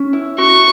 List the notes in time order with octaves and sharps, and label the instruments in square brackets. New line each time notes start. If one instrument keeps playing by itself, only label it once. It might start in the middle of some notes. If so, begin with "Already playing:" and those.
Already playing: [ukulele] C#4
E4
[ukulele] F#4 [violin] C#6